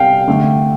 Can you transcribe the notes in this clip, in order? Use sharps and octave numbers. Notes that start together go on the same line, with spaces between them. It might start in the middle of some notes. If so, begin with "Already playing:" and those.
Already playing: C3 G3 F5 G5
D3 A3